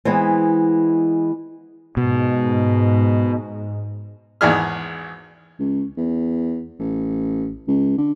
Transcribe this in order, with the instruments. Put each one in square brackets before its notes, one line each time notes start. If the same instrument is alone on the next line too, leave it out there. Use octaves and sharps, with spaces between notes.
[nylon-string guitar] E3 G#3 B3 C4
[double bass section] G#2 [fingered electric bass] B2
[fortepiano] G#1 E2 G#4 F6
[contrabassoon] C#2
E2
A1
C#2
D3